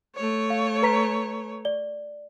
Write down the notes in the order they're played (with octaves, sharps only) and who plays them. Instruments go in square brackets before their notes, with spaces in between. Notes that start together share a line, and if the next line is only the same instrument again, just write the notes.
[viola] A3 C#5
[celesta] F5
B4 A#5 B6
D5 G7